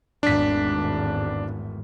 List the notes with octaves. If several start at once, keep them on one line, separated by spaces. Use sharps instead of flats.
G#1 E2 A2 D4 B6